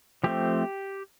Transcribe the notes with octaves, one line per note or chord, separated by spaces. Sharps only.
F3 A3 C4 G4